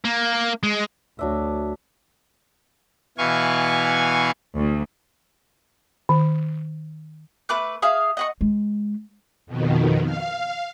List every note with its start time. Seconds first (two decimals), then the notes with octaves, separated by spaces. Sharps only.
0.04 A#3
0.63 G#3
1.19 D2 F#3 D4 E5
3.18 B2 E3 F5 G#5 C#6
4.56 D2
6.09 D#3
7.49 A3 B4 D6 F#6
7.82 G#4 E5 F5
8.17 D#5 F#5 C#6
8.41 G#3
9.46 F2 B2 D#3
10.05 F5